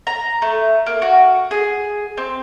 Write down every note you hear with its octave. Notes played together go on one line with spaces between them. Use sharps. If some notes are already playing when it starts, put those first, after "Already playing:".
A#5
A3
A#3
F#4
G#4
C4